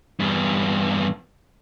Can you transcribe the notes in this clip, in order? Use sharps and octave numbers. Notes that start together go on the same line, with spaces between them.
E2 G2